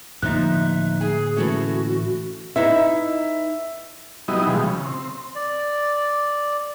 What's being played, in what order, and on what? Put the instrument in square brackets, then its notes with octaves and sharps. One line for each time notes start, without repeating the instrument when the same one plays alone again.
[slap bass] A2 D3 A#3 [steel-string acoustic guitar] F3 D#4 [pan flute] E5 [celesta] F#6
[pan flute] G#4 [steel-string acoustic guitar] G#5
[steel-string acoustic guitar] E3 A3 C#4 [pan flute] F#4
[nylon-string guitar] D#4 E4 B4 [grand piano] E5
[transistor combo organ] F#3 G3 B3 D#4 E4 D#5
B2 E3 F3 G3 G#3
C#3
C4
[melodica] D5